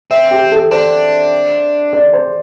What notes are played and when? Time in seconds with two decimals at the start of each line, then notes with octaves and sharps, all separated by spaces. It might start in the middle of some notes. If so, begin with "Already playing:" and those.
0.11 C4 E5
0.31 G4
0.52 A4
0.71 D4 C5
1.93 D5
2.13 C5